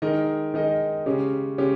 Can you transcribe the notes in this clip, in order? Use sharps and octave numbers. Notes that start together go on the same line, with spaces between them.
D#3 G#3 D#4 A#4 D#5
D#3 G#3 D#4 A#4 D#5
C#3 G#3 C#4 G4
C#3 G#3 C#4 G4